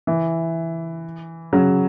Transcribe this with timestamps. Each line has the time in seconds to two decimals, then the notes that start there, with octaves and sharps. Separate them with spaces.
0.07 E3
1.53 C#3 F#3